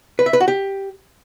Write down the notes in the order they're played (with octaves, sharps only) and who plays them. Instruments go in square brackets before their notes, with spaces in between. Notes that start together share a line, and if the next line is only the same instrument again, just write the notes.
[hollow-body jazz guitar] B4
E5
B4
F#4
G4